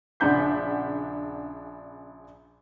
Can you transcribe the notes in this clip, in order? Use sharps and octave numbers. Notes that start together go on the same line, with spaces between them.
A#1 C#3 D4 F#5 G6 B6